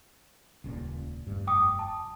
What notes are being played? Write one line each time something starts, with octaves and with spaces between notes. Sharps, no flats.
D#1 C#2 A#2
F1 G2
G5 D6 D#6
A5